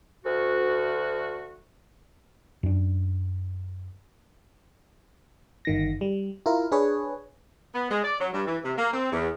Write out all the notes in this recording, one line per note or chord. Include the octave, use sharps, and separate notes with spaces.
D2 F#4
F#2 D4
G1 D#3 A#6
G3
E4 F4 A#4
D4 G#4 B4 C#5
B3
G#3
D5
F#3
G2
E3
C3
A#3
C4
E2